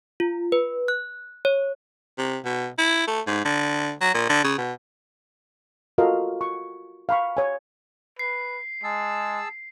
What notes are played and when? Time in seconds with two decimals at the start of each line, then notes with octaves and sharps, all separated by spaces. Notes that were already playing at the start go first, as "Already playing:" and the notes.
0.20 F4
0.52 B4
0.88 F#6
1.45 C#5
2.18 C3
2.45 B2
2.78 E4
3.08 A3
3.27 G#2
3.45 D3
4.01 F#3
4.14 A#2
4.29 D3
4.44 C#3
4.58 B2
5.98 F4 F#4 A4 A#4 D#5 F5
6.41 C#6
7.09 F5 B5 C#6
7.37 C#5 G#5
8.19 B4 C7
8.84 G#3 G#4 A5 E6